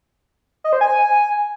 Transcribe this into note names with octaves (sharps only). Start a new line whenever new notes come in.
D#5
C5
G#5